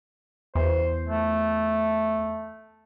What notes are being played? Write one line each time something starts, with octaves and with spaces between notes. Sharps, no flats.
E2 C5
A3